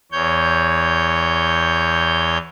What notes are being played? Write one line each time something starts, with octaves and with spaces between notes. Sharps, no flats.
E2 C#5 G6